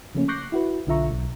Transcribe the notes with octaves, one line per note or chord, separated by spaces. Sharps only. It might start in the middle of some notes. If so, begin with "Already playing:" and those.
C#3 F3 A3 A#3 C#4
C#6 D6 F#6 G6 A#6 C7
E4 F#4 B4
B1 D3 F4 E5 A#5 C#6
B1